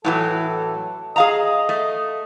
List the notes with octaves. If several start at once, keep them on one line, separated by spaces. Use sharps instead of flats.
A2 E3 F#3 A4
G#4 D#5 F5 A#5
A3